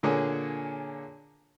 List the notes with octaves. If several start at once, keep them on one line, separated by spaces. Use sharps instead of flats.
A#2 D3 A#3 G#4 C#5